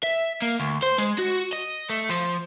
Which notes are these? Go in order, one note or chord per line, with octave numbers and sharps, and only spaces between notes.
E5
A#3
D2
C5
G#3
F#4
D#5
A3
F3